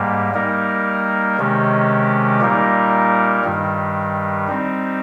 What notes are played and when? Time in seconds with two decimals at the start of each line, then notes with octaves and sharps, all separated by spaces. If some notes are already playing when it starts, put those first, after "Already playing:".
Already playing: G#2 G3 A#3
0.34 G3 A#3 D#4 A#4
1.38 C3 D#3 G#3 C#4 G4
2.41 A#2 G3 A#3 D#4 A#4
3.44 G2 D#3 G3
4.47 G3 C4 D#4